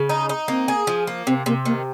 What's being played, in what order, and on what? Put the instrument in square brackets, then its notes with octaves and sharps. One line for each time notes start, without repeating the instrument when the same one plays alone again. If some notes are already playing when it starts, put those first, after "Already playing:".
Already playing: [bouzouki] C#3
D#4
D#4
[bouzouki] A#3 [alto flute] C4
[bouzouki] G#4
F3
A#3
[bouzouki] C3 [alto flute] C4
[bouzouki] C3 [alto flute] A#3
[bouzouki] D#3 [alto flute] A#3